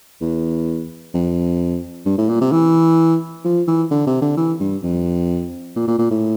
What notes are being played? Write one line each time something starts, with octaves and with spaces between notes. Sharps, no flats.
E2
F2
G2
A2
A#2
C3
E3
F3
E3
D3
C3
D3
E3
G2
F2
A#2
A#2
A#2
A2